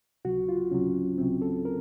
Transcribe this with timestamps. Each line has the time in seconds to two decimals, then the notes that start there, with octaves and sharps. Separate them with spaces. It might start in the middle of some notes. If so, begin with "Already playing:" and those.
0.25 C#2 C3 F#3 F#4
0.49 F4
0.71 C#2 C3 F#3 C#4
1.18 C#2 C3 F#3 C4
1.42 A4
1.65 A#4